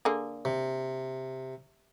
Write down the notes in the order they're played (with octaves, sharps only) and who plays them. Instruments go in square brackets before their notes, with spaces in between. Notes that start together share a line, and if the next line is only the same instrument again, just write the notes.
[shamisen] D3 A#3 G#4
[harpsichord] C3